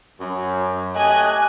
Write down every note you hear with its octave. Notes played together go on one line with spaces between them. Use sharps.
F#2
A3 G4 D#5 G#5 F#6